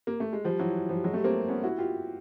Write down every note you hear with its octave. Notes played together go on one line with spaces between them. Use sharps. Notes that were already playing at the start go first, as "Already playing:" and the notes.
A#3
A3
G#3
F3 G3
E3 F#3
F3 G3
F#3 G#3
G3 A3
A#3 C4
B3 C#4
E4 F#4
F4 G4